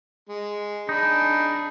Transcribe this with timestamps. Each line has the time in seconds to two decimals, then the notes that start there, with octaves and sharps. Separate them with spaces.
0.29 G#3
0.89 D4 D#4 G#4 B5